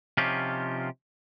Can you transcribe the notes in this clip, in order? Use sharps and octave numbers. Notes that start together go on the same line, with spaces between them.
C3 F3 C#4 D#4 F4 G4